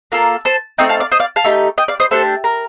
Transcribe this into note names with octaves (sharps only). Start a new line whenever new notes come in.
A#3 F4 A4 A#4
A4 C5
A3 C4 D#4 D#5 G5
F5 A5
D5 F5
C5 D#5
D5 F5
F5 A5
A3 D#4 G4
D#5 G5
D5 F5
C5 D#5
A3 D4 G4 A4 C5
A#4